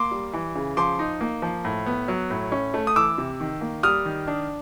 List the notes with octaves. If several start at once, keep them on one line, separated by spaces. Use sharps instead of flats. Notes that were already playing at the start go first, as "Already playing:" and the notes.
Already playing: A#3 C6 D6
G3
E3
C#3
F3 C6 D6
D#4
A#3
F3
A2
B3
F#3
A2
C#4
A3
D#6
E3 D6 E6
C3
D#3
A#3
G3 D#6 F6
D#3
D4